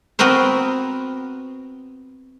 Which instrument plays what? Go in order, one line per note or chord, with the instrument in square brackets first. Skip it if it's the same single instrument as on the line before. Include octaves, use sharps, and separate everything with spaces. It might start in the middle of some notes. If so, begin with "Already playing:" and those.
[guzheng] B3 C4 F#4 A#4 C5